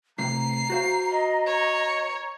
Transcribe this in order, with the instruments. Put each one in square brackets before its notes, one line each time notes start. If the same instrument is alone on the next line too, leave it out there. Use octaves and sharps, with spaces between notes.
[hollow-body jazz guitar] A2 C3 [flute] A#5 [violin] C7
[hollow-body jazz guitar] F#4 C5 F5
[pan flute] D#5
[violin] C#5